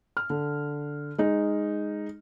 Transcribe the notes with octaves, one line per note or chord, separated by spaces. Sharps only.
F6
D3
G#3 D#4